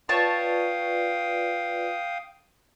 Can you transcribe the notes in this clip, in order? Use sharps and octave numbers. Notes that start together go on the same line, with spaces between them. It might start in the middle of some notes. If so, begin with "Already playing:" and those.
F4 B4 C#5 D5 F5 G5 A5 D#6